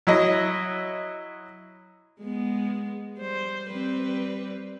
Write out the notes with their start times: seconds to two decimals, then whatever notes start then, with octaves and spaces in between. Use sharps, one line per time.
0.07 F#3 E4 D#5
2.22 G#3 B3
3.18 G3 C5
3.71 G3 C4 B4